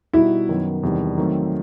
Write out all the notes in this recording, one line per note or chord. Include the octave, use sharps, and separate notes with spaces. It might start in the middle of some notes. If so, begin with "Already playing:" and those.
B2 G3 D#4 E4 F#4
F#2 D#3 F#3 B3
E2 C3 D#3 G3
D#3 F#3 A3 C4